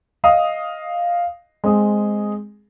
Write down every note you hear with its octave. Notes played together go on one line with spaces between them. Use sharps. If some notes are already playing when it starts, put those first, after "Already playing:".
D#5 F5 D#6
G#3 C4 G#4